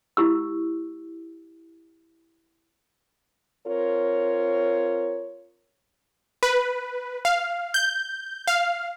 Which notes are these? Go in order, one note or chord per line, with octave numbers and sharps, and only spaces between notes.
E4 G4 E6
C4 F4 A#4 C#5
B4
F5
G6
F5